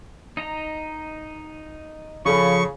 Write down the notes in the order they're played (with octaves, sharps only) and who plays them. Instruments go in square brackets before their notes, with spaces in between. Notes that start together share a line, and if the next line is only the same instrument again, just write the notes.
[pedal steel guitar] D#4 D#5 A#5
[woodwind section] C#3 [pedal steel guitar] F3 [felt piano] A4 B5 [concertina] C#6